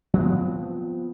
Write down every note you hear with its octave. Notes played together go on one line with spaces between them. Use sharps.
F3 B3 C4